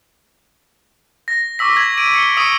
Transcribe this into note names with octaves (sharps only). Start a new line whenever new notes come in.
A#6
C#6 D6 E6 B6
G#6
D7 D#7
C#7 G7
C#6 D#6 E6 C#7 D#7